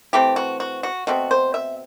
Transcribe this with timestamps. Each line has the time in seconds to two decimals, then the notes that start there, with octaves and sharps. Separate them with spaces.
0.13 E3 A3 C4 G4
0.36 F#4
0.60 F#4
0.83 F#4
1.07 B2 A3 C4 F#4
1.31 C5
1.54 E5